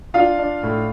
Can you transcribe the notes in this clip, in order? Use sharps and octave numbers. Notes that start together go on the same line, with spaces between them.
D4 F4 F5
D4
A2